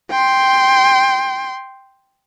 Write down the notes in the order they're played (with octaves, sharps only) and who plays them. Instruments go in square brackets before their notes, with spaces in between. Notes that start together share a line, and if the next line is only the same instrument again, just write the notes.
[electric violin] G5 C6